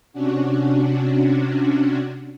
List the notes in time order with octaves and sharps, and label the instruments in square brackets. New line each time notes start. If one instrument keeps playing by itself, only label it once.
[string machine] C3 C#4 D4 F#4